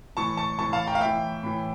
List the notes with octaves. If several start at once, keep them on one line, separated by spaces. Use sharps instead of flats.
A2 E3 A5 C#6
A5 C#6
A2 E3 A5 C#6
F5 A5
G5 A#5
F5
A2 E3 E5 G5
A2 E3